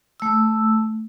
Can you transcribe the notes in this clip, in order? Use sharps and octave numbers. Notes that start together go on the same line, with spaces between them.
A3 E6